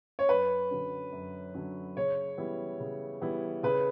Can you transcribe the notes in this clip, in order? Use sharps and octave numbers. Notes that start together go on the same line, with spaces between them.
C#5
F#2 B4
D3 F#3 C#4
F#2
D3 F#3 C#4
C#3 C#5
E3 G3 B3 E4
C#3
E3 G3 B3 E4
C#3 B4